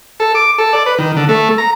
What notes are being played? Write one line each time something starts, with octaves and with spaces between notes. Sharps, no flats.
A4
D6
A4
D5
B4
D#3
D3
A3
A#5